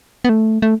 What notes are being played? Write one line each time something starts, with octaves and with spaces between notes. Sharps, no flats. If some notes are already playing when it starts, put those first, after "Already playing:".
B3
A3
A3